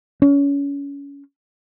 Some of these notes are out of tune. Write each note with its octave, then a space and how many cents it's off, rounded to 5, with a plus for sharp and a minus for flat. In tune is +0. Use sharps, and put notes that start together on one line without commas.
C#4 +25